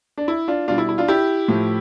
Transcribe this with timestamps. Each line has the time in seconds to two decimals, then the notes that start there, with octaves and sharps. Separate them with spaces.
0.18 D4
0.28 E4
0.48 D4 F4
0.68 B2 G3 D4 F4
0.78 E4
0.89 E4
0.98 D4 F4
1.08 E4 G4
1.48 A2 F3